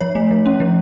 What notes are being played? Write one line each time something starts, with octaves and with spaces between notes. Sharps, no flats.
F3 C#5
A3
F3
C#4
F3